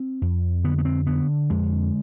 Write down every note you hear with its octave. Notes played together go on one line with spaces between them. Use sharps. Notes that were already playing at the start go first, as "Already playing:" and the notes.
Already playing: C4
F2
D3 B3
B3
C4
D3 B3
F2 G#3